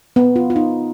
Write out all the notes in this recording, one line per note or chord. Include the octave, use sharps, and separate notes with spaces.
B3
F4
F4
D#4